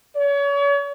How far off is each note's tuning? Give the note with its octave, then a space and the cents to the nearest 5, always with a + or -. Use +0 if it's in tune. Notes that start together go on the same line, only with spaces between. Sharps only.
C#5 +35